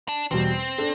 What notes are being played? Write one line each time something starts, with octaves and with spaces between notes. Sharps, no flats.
D4
E2 B2 G3 C4
D4 A4